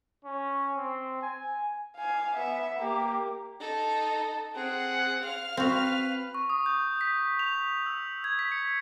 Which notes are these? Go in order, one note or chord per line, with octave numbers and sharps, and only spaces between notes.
C#4
C4
G#5
F5 G#5
B3 E5
A#3 G4
D#4 A4
C4 G#4 F#5
F5 F6
C4 F#4 B4
C#6
D#6
G6
B6
F7
E6
G#6
B6
C#7